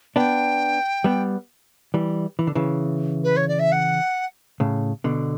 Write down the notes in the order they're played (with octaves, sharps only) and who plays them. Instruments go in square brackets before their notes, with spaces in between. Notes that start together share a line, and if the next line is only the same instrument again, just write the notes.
[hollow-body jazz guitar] B3 D4 [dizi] G5
[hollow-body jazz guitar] G3 B3
E3 G3
E3
D3
C#3 E3
[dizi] B4
C#5
D5
E5
F#5
[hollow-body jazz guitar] A2 C#3
B2 D3